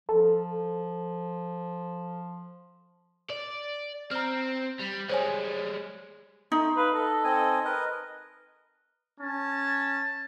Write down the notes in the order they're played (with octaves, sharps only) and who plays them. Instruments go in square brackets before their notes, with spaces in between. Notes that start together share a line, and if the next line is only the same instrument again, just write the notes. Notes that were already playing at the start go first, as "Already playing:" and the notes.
[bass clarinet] F3 [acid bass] A4
[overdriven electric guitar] D5
[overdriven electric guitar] C4 [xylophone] A#5 F6
[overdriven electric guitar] G3
[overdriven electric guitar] G3 G#3 [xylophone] C5 C#5 G#5
[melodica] A3 C6 [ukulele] D#4
[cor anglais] B4 [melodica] F5
[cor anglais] A4 [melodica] D#5
[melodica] C4 D#5 G#5
A#4 B4 D#5
[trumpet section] C#4 A5